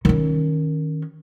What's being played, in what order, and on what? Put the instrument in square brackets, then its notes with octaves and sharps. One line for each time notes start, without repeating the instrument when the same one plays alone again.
[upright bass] D#3 C#4